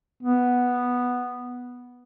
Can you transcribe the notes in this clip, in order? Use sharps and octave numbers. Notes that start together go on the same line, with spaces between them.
B3